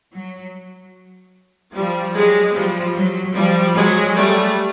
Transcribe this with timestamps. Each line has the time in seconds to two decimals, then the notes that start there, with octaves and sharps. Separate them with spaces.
0.14 F#3
1.75 F3 G3
2.15 F#3 G#3
2.55 F3 G3
2.96 F#3
3.35 F3 G3
3.75 F#3 G#3
4.16 G3 A3